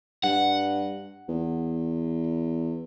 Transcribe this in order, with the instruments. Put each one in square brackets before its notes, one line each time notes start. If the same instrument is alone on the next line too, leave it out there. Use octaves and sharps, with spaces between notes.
[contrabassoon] G2 [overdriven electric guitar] F#5
[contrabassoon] E2